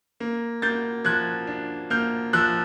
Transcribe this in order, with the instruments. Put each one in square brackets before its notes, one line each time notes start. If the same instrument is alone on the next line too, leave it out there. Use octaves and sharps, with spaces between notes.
[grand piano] A#3
A#3 G6 A6
F3 F#6 G#6
D4
A#3 F6 G6
F3 E6 F#6